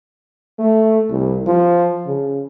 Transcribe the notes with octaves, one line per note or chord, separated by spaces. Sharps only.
A3
C2
F3
C#3